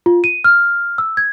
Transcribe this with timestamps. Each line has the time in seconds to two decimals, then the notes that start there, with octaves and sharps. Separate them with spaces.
0.06 F4
0.24 D#7
0.44 F6
0.98 E6
1.17 G#6